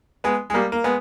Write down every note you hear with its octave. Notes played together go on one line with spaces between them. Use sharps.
G#3 B3
G#3
G3 A#3
A#3
G#3 B3